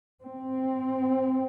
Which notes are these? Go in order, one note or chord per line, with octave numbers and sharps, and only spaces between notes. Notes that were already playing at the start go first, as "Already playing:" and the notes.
C4